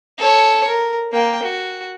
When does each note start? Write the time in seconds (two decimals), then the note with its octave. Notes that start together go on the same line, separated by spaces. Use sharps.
0.18 A4 C#5
0.67 A#4
1.13 A#3 G5
1.43 F#4